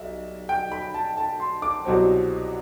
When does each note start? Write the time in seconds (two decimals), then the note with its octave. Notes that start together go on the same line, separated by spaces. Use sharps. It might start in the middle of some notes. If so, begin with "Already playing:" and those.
Already playing: B1 G3 E5
0.49 G5
0.72 B5
0.94 A5
1.17 A5
1.40 C6
1.62 D6
1.85 C2 B2 F#3 C4